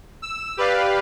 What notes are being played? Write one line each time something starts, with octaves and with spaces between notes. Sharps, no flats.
E6
G4 B4 D5 F5